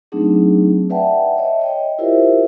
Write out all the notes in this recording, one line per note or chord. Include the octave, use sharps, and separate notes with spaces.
F#3 A3 C4 D4 D#4 G#4
B4 D5 E5 F#5 G5 A5
C#5 D#5 E5
C#5 D#5 G5
E4 F4 G4 A#4 C5 E5